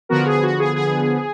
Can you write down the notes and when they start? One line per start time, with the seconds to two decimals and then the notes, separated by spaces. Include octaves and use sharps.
0.09 D3 F3 B3 F#4 A#4
0.26 G#4
0.43 F#4
0.59 G#4
0.76 G#4